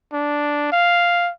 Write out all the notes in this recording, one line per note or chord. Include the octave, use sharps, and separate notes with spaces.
D4
F5